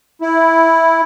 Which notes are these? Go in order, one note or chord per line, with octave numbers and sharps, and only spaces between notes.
E4